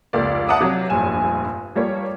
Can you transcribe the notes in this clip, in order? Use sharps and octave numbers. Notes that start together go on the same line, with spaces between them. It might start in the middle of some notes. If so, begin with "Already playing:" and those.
F1 C#2 A#3 D5
E5 F#5 A5 A#5 D6 D#6
C3 F#3
F1 A#1 G2 G#5 E7
F3 G3 A#3 C#5